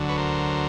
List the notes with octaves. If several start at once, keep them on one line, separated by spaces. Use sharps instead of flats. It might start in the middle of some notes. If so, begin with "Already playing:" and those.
Already playing: D2 D3 F#3
B4 C#5
A#4 C5